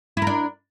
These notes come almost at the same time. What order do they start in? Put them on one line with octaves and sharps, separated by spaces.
E4 A#4 D4